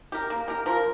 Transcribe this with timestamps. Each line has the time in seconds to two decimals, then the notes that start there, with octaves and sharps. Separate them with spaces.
0.12 G4 A#4
0.30 A#3
0.48 G4 A#4
0.66 F3 A#4